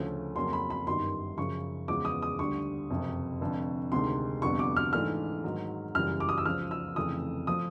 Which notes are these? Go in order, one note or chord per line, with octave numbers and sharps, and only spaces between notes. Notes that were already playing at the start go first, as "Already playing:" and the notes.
Already playing: D2 C#3 F3 A3 C#4
F2 C#3 F#3 A#3 C#4 C6
B5
B5
G1 F#2 D#3 G3 C6
F#2 C#3 F3 C#6
E2 C#3 F3 G#3 B3 D6
D#6
D#6
D2 D3 G3 C#6
F#1 F2 C3
F1 F2 D3
D2 C3 D#3 G#3 C6
F1 F2 D3 G3 B3 C#6
D6
F6
G#2 E3 A3 D4 F6
G#2 D#3 F#3
F#2 C#3 E3 G3 F6
D6
D#6
E6
C#2 C#3 F3 F6
E6
F1 F2 C#3 E3 A3 D#6
F3 A3 D#6